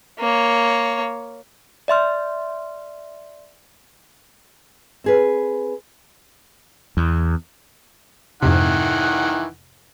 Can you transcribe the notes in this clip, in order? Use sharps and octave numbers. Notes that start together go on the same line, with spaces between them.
A#3 C#5
D5 E5 C6 F6
C4 G#4 B4
E2
F2 G#2 C3 D#3 E3 F#5